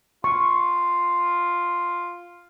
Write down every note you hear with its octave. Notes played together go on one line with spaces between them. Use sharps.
F4 C#6